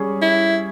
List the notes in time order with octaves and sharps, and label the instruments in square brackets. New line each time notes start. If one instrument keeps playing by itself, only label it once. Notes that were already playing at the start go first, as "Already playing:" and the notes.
Already playing: [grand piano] G3 C#4 G#4 C#5
[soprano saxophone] E4